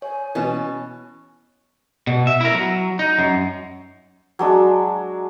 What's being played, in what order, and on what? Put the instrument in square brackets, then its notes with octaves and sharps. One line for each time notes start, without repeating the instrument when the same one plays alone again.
[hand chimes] C#5 [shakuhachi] G#5
[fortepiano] B2 E3 [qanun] C#4 A5
[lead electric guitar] B2
E5
E4 A#4
F#3
D#4
F#2
[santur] F#3 G#3 D4